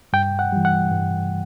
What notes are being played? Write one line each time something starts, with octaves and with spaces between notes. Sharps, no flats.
G2 G5
F#5
E3 G3
F#5
G2